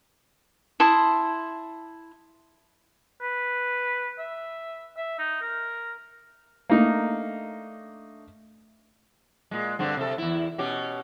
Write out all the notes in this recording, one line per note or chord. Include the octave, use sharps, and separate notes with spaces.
E4 A5 C6 D#6
B4
E5
E5
D#4
A#4
A3 A#3 D4 D#4
A#2 G#3
G2 D3 C4
C3 A4
E2 E4
B2 C#4 G4